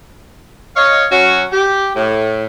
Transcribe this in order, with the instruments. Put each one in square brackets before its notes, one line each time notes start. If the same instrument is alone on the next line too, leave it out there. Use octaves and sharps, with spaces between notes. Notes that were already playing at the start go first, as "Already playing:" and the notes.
[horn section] C#5 D#5 F5
F#3 C#4 F#4
G4
A2